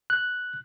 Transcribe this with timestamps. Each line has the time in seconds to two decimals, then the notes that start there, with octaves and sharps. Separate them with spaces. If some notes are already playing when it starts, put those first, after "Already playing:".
0.10 F#6